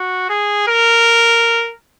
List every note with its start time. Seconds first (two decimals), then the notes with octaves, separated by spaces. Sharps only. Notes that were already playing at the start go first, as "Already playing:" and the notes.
Already playing: F#4
0.30 G#4
0.68 A#4